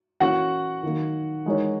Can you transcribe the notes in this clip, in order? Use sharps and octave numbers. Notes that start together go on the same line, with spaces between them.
E3 A#3 C#4 E4 F#4 F#5
D#3 F#3 A#3
E3 G#3 D#4 A#4 C#5